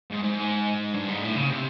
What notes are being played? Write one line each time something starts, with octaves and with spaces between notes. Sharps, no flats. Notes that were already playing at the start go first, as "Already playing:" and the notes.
G#2
G#2
G2
G#2
A2
C#3
C3